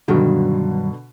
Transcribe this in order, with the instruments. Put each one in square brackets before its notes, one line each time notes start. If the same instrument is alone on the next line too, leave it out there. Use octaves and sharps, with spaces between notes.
[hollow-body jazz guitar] G2 D#3 F#3 [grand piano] B2 D3